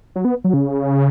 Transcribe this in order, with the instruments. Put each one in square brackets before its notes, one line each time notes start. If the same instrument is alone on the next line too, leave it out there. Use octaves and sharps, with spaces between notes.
[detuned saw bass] F#3
B3
F#3
C#3